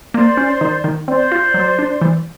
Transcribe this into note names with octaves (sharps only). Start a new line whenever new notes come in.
A#3 C5 D5
C#4
D#3
D#3
C4 C5 D5
F4
F#3
D4
E3